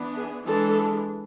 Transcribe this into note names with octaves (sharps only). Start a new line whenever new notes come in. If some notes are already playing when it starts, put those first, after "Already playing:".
Already playing: E3 B3 D4
G#4
E3 G#3 D4 A4